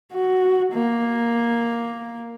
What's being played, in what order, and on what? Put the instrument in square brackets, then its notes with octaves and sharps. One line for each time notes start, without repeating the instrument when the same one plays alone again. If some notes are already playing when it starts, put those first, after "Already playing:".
[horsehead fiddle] F#4
A#3